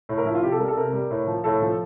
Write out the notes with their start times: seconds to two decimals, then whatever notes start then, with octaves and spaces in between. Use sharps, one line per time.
0.09 A2
0.18 A#4
0.25 F3 E4
0.35 F4
0.43 C3 G4
0.52 A4
0.60 G3 A#4
0.68 A4
0.77 C3 A#4
0.93 G3
1.11 A2
1.27 F3
1.44 A2 A4
1.62 F3